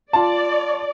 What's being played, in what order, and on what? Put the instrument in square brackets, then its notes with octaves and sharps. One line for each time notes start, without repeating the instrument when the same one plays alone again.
[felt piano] F4 A5 [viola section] D5